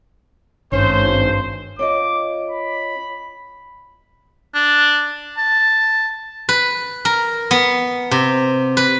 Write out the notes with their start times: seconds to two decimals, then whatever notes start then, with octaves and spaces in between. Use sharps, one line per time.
0.72 G#1 G2 C#4 C5
1.79 C#4 F4 D#5 D6
2.50 B5
4.54 D4
5.37 A5
6.49 B4
7.05 A#4
7.51 B3
8.11 C3
8.77 B4